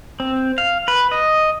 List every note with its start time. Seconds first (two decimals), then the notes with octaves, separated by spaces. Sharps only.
0.20 C4
0.58 F5
0.88 B4
1.11 D#5